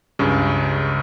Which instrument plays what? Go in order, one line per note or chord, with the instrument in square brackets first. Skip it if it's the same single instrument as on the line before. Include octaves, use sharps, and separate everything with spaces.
[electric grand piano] C#2 G2 C#3